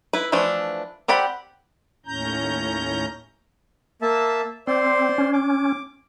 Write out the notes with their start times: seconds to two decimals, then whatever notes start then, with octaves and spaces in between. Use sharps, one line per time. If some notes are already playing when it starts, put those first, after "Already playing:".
0.13 E4 B4
0.32 E3 F3 A3 D4
1.08 C4 G4 D5 F#5 B5
2.06 D#2 A2 C#4 A#5 G6
4.02 A#3 E5 A5
4.67 C4 C5 D5 C6
5.18 C#4
5.33 D6